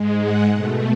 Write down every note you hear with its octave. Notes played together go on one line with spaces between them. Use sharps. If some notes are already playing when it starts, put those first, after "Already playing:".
Already playing: G#2 G#3
F#5
B2 A3